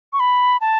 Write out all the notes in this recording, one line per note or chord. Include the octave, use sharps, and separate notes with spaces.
C#6
B5
A5